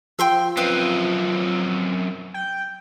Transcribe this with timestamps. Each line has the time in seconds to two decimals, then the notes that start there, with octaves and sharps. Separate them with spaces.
0.19 F3 G5 C6 E6
0.57 F#2 C4 B4 D#5 F5
2.34 G5